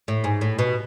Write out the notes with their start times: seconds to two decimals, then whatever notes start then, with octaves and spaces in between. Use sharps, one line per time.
0.08 A2
0.24 G#2
0.41 A2
0.59 B2